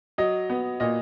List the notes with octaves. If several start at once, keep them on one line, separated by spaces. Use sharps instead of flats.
F#3 D#5
B3
A#2 D#5